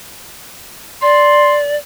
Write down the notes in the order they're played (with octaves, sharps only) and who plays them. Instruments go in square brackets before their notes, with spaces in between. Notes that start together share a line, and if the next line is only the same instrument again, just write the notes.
[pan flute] D5 [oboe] C6